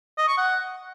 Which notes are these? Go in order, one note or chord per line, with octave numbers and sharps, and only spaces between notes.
D#5
C#6
F#5